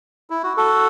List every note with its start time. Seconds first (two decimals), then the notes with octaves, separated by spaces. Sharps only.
0.30 E4
0.43 F#4
0.57 F#4 A4